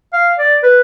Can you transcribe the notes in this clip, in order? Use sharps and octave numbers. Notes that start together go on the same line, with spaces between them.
F5
D5
B4